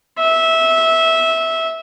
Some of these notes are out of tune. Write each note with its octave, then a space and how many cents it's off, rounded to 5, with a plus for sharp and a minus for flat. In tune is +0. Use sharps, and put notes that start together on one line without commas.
E5 -15